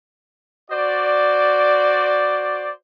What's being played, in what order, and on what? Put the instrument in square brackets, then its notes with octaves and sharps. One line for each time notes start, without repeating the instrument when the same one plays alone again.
[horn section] F#4 C5 D5